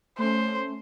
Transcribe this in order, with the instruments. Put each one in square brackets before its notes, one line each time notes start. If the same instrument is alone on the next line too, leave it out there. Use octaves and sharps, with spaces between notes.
[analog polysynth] A3 C#4 [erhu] C5